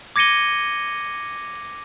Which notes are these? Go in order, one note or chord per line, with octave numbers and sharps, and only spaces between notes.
D6 G#6 A#6 C#7 D#7 G7